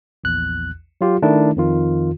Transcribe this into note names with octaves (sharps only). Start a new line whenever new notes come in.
A#1 E2 F#6
F#3 F4 G4
D#3 A3 D4 E4
F2 D#3 F4